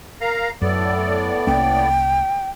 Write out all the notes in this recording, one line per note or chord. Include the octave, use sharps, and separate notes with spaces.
A#4 F5 A#5
F#2 A2 B3 A4 D5
C2 A#3 C#4 G5